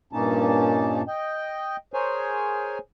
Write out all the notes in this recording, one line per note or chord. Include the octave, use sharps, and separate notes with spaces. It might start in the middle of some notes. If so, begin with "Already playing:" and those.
G2 A#2 A#3 C#4 D#4 A5
D#5 G5
G#4 A#4 C5 C#5 G#5